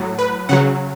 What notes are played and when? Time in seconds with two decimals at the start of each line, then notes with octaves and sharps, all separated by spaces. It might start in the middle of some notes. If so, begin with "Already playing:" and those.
Already playing: A2 F#3
0.19 B4
0.49 C#3 F#3 F#5